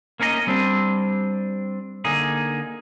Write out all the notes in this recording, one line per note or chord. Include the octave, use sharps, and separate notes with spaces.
A#3 C#4 D#4 E4 D#5
G3 C4 D4
D3 A#3 D#4 G#4